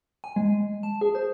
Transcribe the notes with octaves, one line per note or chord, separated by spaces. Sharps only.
G#5
G#3
A5
G#4
C5